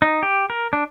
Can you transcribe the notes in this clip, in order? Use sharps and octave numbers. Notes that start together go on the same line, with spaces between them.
D#4
G4
A#4
D4